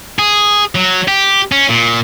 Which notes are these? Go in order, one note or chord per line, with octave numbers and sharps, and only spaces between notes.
G#4
F#3
G4
C#4
A#2